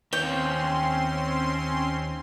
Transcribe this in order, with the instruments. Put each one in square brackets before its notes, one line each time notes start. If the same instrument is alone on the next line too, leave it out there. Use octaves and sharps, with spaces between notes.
[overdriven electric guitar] D#2 C#5 [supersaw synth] C4 C#4 C6 [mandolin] G5